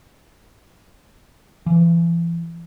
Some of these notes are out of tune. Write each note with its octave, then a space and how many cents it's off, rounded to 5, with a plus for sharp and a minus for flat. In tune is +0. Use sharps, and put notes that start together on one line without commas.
E3 +40